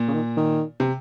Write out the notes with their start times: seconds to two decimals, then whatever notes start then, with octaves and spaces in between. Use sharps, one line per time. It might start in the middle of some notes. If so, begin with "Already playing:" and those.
Already playing: A#2
0.08 C#3
0.14 D#3
0.37 D#3
0.80 C3